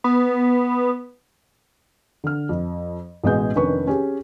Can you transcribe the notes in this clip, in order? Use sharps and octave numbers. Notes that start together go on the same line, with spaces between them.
B3
D3 F6
F2
A1 B2 G#3 B3 G#4 G6
F1 D#3 C#4 D4 B4 C#6
C#4 G4 G#4